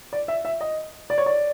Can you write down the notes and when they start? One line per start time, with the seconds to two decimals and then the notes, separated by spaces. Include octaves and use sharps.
0.13 D5
0.28 E5
0.45 E5
0.61 D#5
1.10 D5
1.18 C#5
1.26 D5